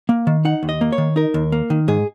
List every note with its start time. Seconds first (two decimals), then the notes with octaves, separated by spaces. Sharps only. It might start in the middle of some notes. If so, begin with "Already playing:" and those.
0.09 A#3
0.27 D#3
0.45 D#4 F#5
0.63 D#2
0.69 D#5
0.81 A#3
0.92 C#5
0.98 D#3
1.16 D#4 A#4
1.34 D#2
1.52 A#3
1.70 D#3
1.88 G#2 G#4